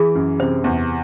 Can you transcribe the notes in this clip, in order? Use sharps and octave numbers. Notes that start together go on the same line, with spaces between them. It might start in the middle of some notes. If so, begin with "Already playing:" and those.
Already playing: E3 G#4
F#2
C3 C5
E2